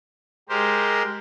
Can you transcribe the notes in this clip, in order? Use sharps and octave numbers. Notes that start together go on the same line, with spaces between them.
G#3 G4 A#4 C5